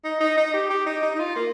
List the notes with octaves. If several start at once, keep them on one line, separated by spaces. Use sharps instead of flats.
D#4
D#4
D#4
G4
G4
D#4
D#4
D#4
F4
A#3